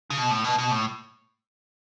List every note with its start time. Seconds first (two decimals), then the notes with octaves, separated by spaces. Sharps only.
0.10 C#3
0.17 B2
0.31 A2
0.44 B2
0.58 B2
0.71 A2